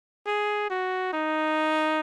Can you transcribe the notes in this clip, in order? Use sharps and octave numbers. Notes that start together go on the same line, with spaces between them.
G#4
F#4
D#4